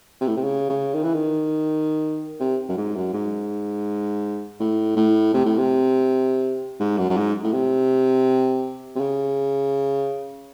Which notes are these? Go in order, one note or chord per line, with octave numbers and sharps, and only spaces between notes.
C3
A2
C3
C#3
C#3
D#3
E3
D#3
C3
F#2
G#2
F#2
G#2
A2
A2
C3
A2
C3
G#2
F#2
F#2
G#2
A2
C3
C3
C#3